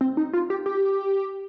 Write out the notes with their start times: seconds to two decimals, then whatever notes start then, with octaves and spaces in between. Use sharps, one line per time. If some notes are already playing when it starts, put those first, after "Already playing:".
0.01 C4
0.17 D#4
0.33 F4
0.50 G4
0.66 G4